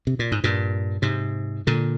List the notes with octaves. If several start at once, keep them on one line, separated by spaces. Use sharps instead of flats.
C3
A#2
G#2
G2 A#2
G#2 C3
A#2 D3